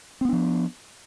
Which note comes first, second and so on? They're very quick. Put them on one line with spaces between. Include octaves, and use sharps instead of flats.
C4 B3 D4 F3